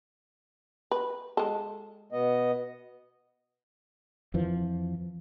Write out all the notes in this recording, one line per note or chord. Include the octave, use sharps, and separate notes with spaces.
B4
G#3 A4
B2 B3 D#5
F2 E3 F3